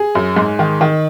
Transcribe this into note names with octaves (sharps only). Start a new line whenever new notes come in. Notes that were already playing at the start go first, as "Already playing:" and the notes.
Already playing: G#4
F#2
G#2
D#3
D#3